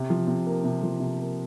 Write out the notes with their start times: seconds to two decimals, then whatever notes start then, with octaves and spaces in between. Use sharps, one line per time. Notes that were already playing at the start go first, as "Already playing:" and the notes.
Already playing: C3
0.10 F3
0.27 C3
0.46 A#3
0.64 C3
0.83 F3
1.00 C3
1.19 A#3